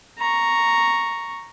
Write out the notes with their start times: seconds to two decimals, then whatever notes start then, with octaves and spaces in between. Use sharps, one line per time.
0.18 A#5 C#6